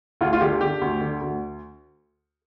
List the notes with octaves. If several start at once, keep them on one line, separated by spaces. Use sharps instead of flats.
D2 F4
F4
D3 G4
D3 G4
D2
D3
D2